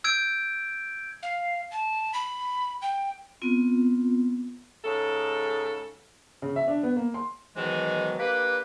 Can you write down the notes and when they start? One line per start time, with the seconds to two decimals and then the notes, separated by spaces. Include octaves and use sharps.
0.04 E6 G6 G#6 D7
1.23 F5
1.71 A5
2.13 B5
2.82 G5
3.42 B3 C4 F4
4.84 G#2 C#3 A4
6.42 C#3
6.56 E5
6.68 D4
6.83 B3
6.96 A#3
7.14 C6
7.56 G#2 B2 D#3 E3 F#3 G#3
8.19 G2 A#3 G4 B4